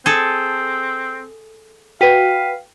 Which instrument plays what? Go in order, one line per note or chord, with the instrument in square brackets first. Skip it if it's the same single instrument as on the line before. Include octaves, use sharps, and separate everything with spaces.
[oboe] C4 [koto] G#4 A4
[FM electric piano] F#4 B4 [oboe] F5 [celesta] G5 B6 D#7